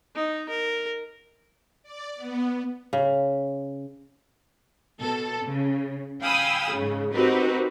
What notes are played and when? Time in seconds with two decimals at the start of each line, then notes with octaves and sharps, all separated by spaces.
0.15 D#4
0.49 A#4
1.83 D5
2.16 B3
2.93 C#3
5.00 B2 A4
5.45 C#3
6.20 F5 G5 G#5 B5 D#6 E6
6.71 G#2 C#3
7.13 C4 D#4 F#4 G4 A#4 B4